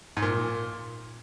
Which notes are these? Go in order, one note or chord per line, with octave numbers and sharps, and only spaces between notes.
G#2
A#2